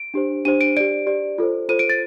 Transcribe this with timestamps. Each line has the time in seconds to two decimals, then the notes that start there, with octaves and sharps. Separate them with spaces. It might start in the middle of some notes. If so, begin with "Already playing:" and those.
Already playing: D7
0.14 D4 G4 C5
0.45 D4 G4 C5 D#7
0.61 D7
0.77 G4 D5 D7
1.07 G4 D5
1.38 F4 A4 C5
1.69 F4 A4 C5 D#7
1.79 D7
1.89 A6